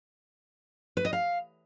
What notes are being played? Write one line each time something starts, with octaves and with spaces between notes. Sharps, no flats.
B4
D#5
F5